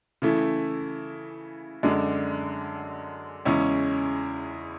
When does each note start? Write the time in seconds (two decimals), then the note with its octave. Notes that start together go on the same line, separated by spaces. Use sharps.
0.22 C#3 E3 A3 E4
1.83 F#2 D3 G#3 D4
3.45 E2 C#3 G#3 C#4 E4